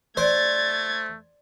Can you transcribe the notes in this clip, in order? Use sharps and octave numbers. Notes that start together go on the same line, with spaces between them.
A3 C5 D5 G#6 A6